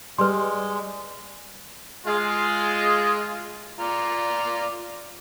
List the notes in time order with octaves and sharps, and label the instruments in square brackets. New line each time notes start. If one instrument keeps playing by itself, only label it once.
[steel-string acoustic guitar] G3 [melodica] G#3 [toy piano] B4 C6
[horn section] G#3 F4
[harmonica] F4 D5 A#5